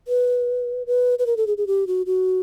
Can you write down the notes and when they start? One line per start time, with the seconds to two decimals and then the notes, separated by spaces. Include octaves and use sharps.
0.08 B4
0.87 B4
1.19 B4
1.26 A#4
1.37 A4
1.47 G#4
1.58 G#4
1.67 G4
1.87 F#4
2.06 F#4